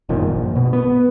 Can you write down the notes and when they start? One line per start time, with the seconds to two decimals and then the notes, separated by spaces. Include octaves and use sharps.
0.09 G1 F#2 A#2 D#3
0.24 A#1
0.56 B2
0.73 B3